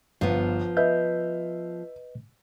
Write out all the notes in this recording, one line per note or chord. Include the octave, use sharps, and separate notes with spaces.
G1 F3 B3
B4 D#5 E5 G6